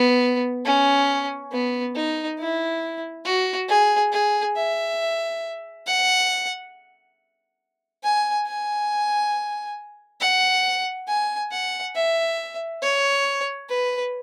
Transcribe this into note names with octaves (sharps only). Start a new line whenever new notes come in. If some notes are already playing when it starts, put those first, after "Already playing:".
Already playing: B3
C#4
B3
D#4
E4
F#4
G#4
G#4
E5
F#5
G#5
G#5
F#5
G#5
F#5
E5
C#5
B4